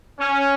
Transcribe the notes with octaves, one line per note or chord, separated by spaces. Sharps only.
C#4